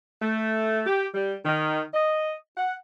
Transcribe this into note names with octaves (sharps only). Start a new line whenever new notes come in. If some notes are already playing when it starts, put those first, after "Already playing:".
A3
G4
G3
D#3
D#5
F#5